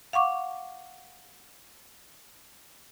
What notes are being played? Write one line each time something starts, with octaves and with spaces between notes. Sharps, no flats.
F5 F#5 C#6 D6